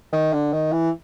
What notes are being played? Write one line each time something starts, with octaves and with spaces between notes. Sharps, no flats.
D#3
D3
D#3
E3